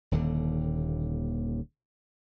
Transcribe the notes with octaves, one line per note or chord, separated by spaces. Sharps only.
D#1 D#2 D3